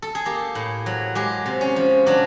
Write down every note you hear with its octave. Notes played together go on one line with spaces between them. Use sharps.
A4
G#4
A#3 G4
A2
F#3
G#3 G4
C3
C#4
F3
F#3 D4